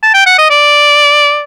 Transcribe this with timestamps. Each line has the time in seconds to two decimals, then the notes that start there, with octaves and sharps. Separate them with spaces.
0.03 A5
0.14 G5
0.27 F#5
0.39 D#5
0.50 D5